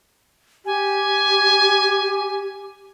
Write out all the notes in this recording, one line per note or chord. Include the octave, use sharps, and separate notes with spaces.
G4 G#5